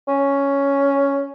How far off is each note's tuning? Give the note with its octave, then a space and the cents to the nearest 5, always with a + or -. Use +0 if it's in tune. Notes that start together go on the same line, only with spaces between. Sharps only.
C#4 +5